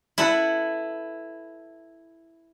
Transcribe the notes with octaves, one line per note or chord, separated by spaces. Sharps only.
E4 A4 B4 F#5